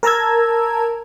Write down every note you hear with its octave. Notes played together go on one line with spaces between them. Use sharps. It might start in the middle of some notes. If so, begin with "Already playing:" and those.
A#4 A5 A#5 E6 G#6